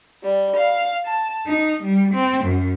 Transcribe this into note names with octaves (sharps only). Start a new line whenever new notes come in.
G3
F5
A5
D#4
G3
C4
F#2